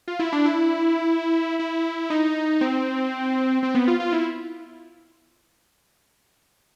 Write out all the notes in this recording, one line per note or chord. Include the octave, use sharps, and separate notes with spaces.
F4
E4
D4
E4
E4
D#4
C4
C4
B3
F4
F4
E4